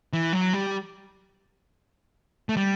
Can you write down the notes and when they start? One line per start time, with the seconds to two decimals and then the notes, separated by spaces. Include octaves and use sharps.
0.13 E3
0.33 F#3
0.53 G3
2.49 A3
2.57 G3